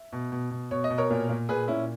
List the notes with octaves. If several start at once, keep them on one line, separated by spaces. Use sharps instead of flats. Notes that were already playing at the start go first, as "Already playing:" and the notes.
Already playing: E5
B2
B2
B2
B2 C#5
D#5
B2
A#4 C#5
A#2
A#2
A#2 G#4 B4
A#2 C#4 E4